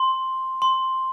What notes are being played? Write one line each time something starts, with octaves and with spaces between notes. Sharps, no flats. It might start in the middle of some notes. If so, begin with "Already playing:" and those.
Already playing: C6
C6